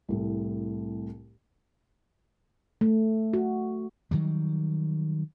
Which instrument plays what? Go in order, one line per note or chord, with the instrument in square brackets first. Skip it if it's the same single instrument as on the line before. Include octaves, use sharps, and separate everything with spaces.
[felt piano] C2 A2
[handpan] A3
F#4
[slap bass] D#3 F#3 G3